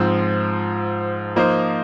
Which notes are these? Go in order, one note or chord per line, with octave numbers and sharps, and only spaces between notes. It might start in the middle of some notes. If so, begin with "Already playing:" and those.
Already playing: G#2 F3 C4
F3 A#3 D#4 C5